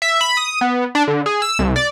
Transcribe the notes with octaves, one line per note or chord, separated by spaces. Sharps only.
E5
B5
D#6
B3
D4
D3
G#4
E6
C2
D5